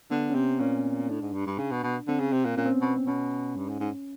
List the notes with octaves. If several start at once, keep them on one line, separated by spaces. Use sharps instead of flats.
D3 B3
C#4
C3 C4
A#2 C#4
A2 D4
G#2
G2
G2
C#3
B2
B2
D3 C4
C#3
C3
A#2
A#2 C#4
C4
B3
B2 C4
C4
B2 C#4
G2
G#2
G#2